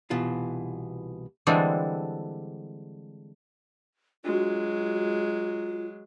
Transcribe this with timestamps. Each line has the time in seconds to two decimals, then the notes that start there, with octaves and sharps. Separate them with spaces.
0.10 C2 B2 E3 F4
1.47 D3 E3 G3 G#3 C4 D4
4.24 F#3 G#3 D4 F4 F#4